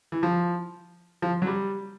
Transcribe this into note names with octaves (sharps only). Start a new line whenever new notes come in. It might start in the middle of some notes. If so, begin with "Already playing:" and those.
E3
F3
F3
F#3
G3